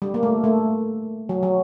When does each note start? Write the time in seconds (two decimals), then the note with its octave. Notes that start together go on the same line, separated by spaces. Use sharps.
0.02 G3
0.14 A#3
0.23 A3
0.44 A3
1.29 F#3
1.43 F#3